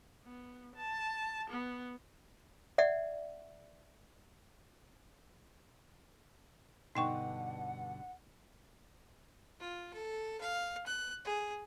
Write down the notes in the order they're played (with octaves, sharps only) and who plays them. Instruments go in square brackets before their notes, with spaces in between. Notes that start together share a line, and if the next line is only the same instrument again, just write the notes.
[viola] B3
A5
B3
[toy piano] D5 E5 F#5
[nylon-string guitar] G2 B2 D3 [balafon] D#4 G5 C#6 [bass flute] F#5
[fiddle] F4
A4
F5
F#6
G#4